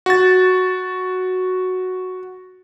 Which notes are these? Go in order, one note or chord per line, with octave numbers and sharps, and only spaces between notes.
F#4 A6